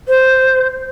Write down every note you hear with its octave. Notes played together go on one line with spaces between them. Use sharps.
C5